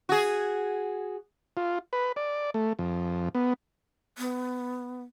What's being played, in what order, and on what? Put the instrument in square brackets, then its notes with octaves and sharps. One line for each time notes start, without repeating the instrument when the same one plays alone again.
[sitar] F#4 G#4
[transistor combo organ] F4
B4
D5
A3
F2
B3
[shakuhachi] B3